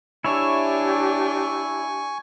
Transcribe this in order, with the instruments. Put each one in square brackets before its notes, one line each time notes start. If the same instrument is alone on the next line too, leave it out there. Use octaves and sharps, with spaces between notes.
[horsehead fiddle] D4 G4 [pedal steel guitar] E4 C#5 E5 [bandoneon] G#5 C#6